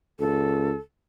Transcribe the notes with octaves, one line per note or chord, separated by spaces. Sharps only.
C#2 A4